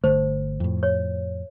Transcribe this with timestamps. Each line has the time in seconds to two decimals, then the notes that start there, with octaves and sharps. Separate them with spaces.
0.04 G1 D3 A3 C5
0.60 F2 A2
0.83 C#5